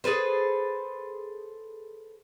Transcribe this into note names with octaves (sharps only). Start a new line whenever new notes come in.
G#4 A4 B4 C5